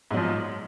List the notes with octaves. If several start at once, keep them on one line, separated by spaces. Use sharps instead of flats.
G#2 F3 F#3